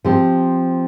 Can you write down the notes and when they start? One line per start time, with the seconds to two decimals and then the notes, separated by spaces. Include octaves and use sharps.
0.05 F3 C4 G4